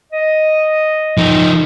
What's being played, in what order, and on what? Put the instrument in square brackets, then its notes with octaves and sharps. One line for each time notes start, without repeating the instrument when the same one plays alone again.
[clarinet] D#5
[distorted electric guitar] F3 D#4